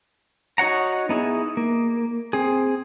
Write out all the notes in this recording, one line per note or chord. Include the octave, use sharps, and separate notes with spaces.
D#4 F#4 C#5 F#5 A#5
B3 D#4 E4 G#4
A#3
C4 G#4